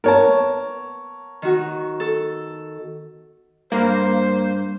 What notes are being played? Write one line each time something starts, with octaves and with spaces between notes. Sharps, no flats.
B3 A#4 C#5 A5
D#3 F#4
A4
G2 A#3 C5